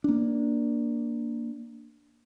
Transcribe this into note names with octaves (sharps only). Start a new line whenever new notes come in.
A#3 D4